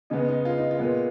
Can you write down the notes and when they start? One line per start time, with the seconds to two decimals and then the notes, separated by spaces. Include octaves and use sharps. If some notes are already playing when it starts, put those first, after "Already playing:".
0.10 C#3 G#3 B3 D#4
0.28 D#4
0.45 F4
0.58 D#4
0.71 F4
0.79 A#2 G#3 B3